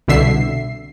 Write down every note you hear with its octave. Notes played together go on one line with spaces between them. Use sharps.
C2 B2 D3 E5 C7